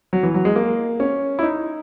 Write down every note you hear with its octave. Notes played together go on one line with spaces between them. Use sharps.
F#3
E3
F#3
G#3
A#3
C#4
E4
D#4